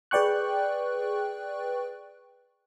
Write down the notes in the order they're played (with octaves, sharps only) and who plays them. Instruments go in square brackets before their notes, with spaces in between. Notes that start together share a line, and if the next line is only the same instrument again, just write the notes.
[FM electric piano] G#4 B4 D5 G5 C#6 F#6